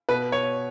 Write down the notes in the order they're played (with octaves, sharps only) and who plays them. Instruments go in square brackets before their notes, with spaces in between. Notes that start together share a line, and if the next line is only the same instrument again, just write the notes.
[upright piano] B2 B4
C#5